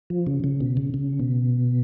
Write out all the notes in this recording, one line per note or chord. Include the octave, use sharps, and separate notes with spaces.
F3
C#3
C#3
B2
C#3
C#3
B2